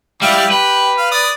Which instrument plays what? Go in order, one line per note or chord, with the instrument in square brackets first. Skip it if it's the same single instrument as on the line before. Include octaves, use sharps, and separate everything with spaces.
[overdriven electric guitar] G3 [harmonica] E4 G4 F5
[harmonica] G4 [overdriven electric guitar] B4
[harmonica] F5
D5 D#6